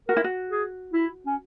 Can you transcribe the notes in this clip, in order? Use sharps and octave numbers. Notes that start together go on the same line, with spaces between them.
F#4 A#4
E4
F#4
G#4
E4
C#4